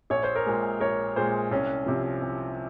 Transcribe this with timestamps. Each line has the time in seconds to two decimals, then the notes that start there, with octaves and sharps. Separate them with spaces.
0.10 A#1 C#5
0.23 C5
0.35 A#4 C#5
0.46 A#2 G#3
0.80 A#1 A#4 C#5
1.16 A#2 G#3 G#4 C5
1.51 C2 C#4
1.86 C3 F3
2.22 C2